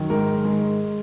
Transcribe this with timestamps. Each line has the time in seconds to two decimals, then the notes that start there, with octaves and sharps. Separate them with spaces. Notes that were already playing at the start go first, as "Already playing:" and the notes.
Already playing: F#2 D#3
0.10 G#2 A#4
0.45 G#3